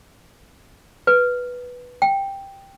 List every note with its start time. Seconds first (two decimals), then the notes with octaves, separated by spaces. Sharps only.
1.07 B4
2.02 G5